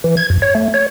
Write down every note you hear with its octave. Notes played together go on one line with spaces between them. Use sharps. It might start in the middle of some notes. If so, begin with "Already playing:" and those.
E3
G#6
F#2
C#5
A3
C#5